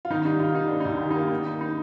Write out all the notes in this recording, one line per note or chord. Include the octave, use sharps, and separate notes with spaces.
F4
D#3 D#4
G3 D#4
D#3 F4
D#3 D#4
A#3 D4
D#4
D#2
D#3 G4
D#4
A#3
F4
D#3 D#4
A#3
D#4